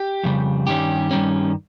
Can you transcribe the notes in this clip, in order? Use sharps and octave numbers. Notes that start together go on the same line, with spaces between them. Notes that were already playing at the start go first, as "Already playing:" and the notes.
Already playing: G4
F2 C#3 G3
G2 D#3 G3 C#4 G4
G2 D#3 G3 C#4